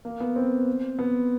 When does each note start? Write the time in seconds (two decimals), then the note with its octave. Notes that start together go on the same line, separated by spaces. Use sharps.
0.05 A#3
0.20 B3
0.36 C4
0.99 B3